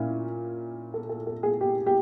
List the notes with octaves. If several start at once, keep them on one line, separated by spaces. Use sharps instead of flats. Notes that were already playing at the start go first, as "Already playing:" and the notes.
Already playing: A#2 C#4 E4
A4
A4
A4
G#4
G4
G4